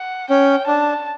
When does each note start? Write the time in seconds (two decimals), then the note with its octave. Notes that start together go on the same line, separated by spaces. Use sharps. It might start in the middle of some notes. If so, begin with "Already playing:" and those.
Already playing: F#5
0.30 C#4 G5
0.67 D4 A5